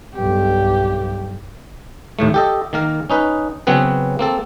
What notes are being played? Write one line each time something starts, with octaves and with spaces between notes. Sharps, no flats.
B1 G2 G4
D#2 A2 A3
G4 A4 D#5
D#3 A#3 A#4
C#4 D#4 B4
C#3 F#3 B3 C4 B4
A#3 C4 A4